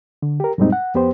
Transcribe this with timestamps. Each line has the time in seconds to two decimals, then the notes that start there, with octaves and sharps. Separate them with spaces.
0.22 D3
0.40 G4 A#4
0.58 F#2 A#2 G3 G#3 C4 D#4
0.72 F#5
0.95 F2 B3 G4 C5